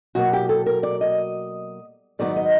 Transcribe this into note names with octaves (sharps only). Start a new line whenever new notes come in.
B2 F#3 A#3 F#4
G4
A4
A#4
D5
D#5
G#2 D#3 F#3 B3 D#4 D5
D#5